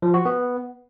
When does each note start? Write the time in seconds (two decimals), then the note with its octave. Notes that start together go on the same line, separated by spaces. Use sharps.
0.02 F3
0.14 F#4
0.25 B3